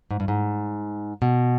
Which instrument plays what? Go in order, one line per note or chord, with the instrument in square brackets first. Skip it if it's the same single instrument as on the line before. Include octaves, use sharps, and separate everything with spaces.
[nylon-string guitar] G#2
G2
G#2
B2